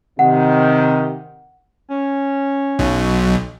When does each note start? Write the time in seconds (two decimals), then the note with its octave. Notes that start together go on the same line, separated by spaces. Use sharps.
0.19 C3 D#3 F#5
1.90 C#4
2.79 B1